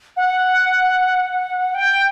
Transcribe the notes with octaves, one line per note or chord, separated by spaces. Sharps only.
F#5
G5